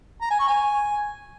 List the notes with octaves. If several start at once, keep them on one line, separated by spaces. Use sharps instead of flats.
A#5
G#5
C#6
G#5